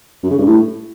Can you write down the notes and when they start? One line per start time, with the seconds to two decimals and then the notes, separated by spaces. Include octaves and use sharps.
0.23 F#2
0.31 C#3
0.38 G2
0.46 A2